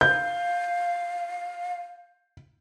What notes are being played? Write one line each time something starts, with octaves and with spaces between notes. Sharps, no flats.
F5 G6